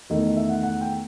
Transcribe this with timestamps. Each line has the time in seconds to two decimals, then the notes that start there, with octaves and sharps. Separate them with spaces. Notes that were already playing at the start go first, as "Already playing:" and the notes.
0.10 E2 D#3 A3 D#5
0.23 D#5
0.37 E5
0.49 F#5
0.63 F#5
0.81 G5